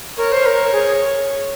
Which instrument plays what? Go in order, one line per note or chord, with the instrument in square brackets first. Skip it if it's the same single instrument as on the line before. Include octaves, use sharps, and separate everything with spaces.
[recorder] A#4 [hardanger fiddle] C#5
[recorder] C5
A#4
G#4